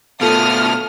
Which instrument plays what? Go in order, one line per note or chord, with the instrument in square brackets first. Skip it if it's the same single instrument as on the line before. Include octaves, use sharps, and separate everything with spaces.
[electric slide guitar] B2 A3 [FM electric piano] F4 A4 F5 [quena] A5 [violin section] D#6 F6